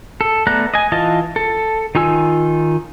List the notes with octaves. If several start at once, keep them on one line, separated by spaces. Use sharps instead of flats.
A4
A3 B3 D5 A#5 F#6
D#5 G#5
E3 F4 D#5 A5
A4
D#3 D#4 F4 G#5 E6